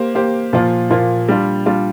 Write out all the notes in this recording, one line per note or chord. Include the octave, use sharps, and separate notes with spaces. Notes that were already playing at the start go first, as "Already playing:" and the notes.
Already playing: A#3 G4 C5
A#3 G4 C5
A#2 F3 A#3 F4
A#2 F3 A#3 F4
G3 D4 F4
G3 D4 F4